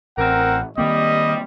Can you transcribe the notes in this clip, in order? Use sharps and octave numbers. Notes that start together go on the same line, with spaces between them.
A1 C4 A#4 F#5
D#3 G3 A#3 C4 D#5